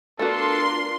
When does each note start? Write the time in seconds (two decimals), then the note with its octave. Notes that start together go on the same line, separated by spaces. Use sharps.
0.19 A3 B3 D4 F4 F#4 A4 A#4 C6